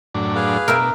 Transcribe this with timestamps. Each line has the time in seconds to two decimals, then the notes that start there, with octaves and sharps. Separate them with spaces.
0.15 F#2 A2 D4
0.35 G#4 B4 F5
0.68 B2 A#4 E5 G5